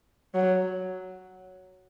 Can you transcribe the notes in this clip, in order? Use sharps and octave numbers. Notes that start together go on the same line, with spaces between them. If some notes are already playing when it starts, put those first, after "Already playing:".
F#3